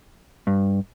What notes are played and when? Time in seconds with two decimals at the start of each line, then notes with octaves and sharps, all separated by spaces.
0.47 G2